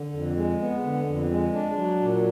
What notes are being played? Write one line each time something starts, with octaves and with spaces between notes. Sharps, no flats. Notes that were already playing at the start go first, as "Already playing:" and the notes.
Already playing: D3
F2
G#3
B3
D3
F2
G#3
D4
F#3
A#2